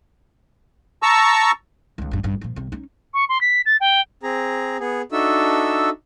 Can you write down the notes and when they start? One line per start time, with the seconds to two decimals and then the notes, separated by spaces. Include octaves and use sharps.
1.03 A5 A#5 C#6 E6
1.98 C#2 D#3
2.11 A1 G2
2.23 A1 G2
2.41 A#2 F3
2.56 C2 C3
2.72 C#4 D#4
3.14 C#6
3.29 C6
3.41 B6
3.65 A6
3.80 G5
4.23 C4 G#4 A#5
4.80 B3 G#4
5.12 D4 D#4 F#4 A4 E5 E6